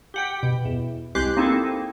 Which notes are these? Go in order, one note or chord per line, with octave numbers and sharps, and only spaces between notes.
G4 F#5 G5
B2
E2
C2 G#3 G4 D6 F#6 C7
A#3 C4 D#4 E4 G#4 A4